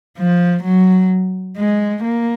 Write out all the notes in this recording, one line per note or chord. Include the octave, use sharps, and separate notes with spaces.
F3
F#3
G#3
A#3